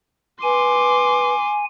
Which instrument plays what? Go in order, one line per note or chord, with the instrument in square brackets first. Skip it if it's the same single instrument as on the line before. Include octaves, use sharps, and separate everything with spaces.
[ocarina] B4 [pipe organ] G#5 [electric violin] C6 D6